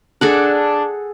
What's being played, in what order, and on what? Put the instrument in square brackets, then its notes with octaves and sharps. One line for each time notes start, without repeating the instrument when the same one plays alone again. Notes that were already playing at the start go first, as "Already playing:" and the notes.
[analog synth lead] D4 [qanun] G#4 A4 F#5